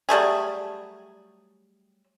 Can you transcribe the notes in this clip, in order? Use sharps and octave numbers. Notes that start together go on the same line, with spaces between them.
F#3 G3 A3 G#4